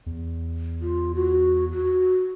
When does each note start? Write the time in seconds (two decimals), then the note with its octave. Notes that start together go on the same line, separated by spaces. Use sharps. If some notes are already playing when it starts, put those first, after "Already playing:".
0.06 E2
0.81 F4
1.14 F#4
1.72 F#4